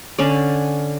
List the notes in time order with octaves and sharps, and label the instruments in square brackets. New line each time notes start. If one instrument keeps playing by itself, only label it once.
[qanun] D3 C#4 D5